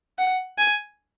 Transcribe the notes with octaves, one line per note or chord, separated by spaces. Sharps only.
F#5
G#5